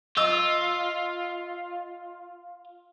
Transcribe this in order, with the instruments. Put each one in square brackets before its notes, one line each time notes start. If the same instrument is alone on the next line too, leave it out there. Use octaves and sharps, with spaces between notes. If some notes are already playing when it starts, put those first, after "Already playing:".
[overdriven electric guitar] F4 [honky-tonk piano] D#5 E6